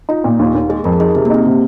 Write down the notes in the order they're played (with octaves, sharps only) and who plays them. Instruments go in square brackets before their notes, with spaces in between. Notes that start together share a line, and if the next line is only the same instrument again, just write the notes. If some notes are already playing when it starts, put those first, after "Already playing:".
[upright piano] D#4 [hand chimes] F4
[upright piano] A#2
D#2
D#2
[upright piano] G#3 [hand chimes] G#4
[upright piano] F2 [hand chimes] A#4
[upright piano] D#4 [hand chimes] G#4
[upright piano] C3 [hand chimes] C4
[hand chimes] A#3
[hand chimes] C4 [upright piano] D#4
[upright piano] C3